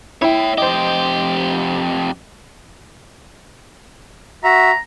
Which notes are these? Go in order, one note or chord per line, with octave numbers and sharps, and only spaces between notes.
E4 C#5 G5
F2 G4 C5 D#5
F#4 E5 A#5